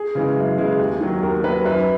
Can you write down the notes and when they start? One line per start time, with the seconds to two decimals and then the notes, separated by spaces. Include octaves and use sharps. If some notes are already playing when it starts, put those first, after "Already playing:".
Already playing: G#4
0.15 C#3 E3 G#3
0.36 F#2
0.58 C#3 E3 G#3
0.79 D#2
1.01 D#3 F#3
1.23 D#2 A#4
1.44 D#3 F#3 B4
1.66 F#2 B4